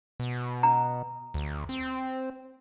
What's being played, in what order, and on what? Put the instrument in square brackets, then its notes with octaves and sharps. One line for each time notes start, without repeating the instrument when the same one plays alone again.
[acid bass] B2
[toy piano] A#5
[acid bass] D2
C4